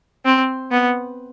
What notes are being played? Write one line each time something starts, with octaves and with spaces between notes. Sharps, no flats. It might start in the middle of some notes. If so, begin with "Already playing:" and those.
C4
B3